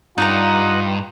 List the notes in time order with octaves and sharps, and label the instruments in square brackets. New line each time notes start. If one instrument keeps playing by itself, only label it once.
[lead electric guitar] G2 [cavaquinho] D#4 D5 A#5 [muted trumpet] F4 [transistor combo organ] D#5 F#5